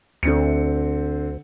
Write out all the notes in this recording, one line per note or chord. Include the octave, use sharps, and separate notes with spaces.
D2 D3 C4 C#7